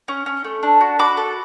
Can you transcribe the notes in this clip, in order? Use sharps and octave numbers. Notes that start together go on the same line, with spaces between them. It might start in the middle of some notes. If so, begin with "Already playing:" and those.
C#4
C#4
A3
D4
F#4
F#4 B5 D6
A4